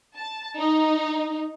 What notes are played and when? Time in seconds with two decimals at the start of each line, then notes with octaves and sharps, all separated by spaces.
0.16 A5
0.58 D#4